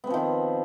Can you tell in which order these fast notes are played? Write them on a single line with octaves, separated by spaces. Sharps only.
B3 C4 F3 D#3